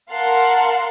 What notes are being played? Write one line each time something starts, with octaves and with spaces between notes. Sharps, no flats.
A#4 F5 F#5 A5 C6